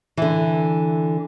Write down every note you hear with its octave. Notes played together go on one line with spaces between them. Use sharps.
D3 E3